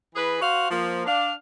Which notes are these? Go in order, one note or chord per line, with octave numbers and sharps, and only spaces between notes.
E3 G#4 B4
F#4 C5 F5
F3 A#3
D4 F5